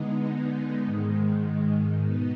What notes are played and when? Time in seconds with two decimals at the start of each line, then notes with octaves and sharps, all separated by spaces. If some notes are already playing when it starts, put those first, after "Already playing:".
Already playing: D3 G#3 B3 D#4
0.85 G#2 D#3 G#3
2.04 B2 B3 D#4